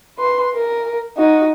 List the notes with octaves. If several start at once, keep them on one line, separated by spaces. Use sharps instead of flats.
B4 C6
A#4
D#4 F#4